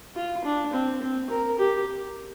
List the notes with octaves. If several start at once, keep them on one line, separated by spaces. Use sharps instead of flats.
F4
D4
C4
C4
A#4
G4